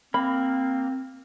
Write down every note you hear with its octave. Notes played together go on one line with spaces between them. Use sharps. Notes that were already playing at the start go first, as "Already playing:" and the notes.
A#3 C4 B5